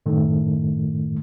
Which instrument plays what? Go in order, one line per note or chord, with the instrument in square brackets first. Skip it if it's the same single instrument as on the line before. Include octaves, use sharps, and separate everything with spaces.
[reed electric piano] F#2 A2 D#3 A3